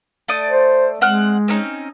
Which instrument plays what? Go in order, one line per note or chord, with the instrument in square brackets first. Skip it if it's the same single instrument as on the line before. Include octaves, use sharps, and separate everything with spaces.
[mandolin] A3 D5 D#6
[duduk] C5
[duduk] G#3 [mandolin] C4 F#5 F6
[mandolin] C4 C#4 D#4